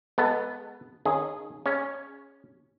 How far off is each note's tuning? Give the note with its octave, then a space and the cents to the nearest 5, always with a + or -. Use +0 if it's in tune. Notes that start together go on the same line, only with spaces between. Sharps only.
G#3 +0 B3 +0 A4 +25
D#3 -25 C#4 +0 G#4 -10
C#4 +0 G#4 +0